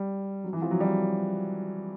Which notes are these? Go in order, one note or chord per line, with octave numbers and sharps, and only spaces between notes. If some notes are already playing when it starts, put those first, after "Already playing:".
Already playing: G3
F#3
E3
F3
F#3
G3